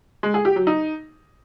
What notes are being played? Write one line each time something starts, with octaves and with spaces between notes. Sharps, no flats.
G#3
G#4
G4
F#3
D#4